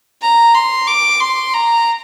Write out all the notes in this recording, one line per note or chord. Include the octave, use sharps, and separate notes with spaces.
A#5
C6
D6
C6
A#5